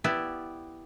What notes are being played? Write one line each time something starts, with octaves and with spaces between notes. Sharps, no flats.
B3 E4 G4 D5